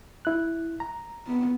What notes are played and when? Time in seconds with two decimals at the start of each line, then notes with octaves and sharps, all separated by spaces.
0.25 E4 F#6
0.80 A#5
1.27 B3